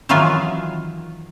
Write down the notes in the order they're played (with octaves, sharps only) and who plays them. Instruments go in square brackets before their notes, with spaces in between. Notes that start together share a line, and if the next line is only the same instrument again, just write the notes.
[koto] D#3 E3 F#3 F4 G#4 G#5